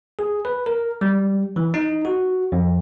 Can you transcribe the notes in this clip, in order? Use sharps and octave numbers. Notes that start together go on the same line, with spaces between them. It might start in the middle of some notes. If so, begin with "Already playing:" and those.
G#4
B4
A#4
G3
E3
D#4
F#4
F2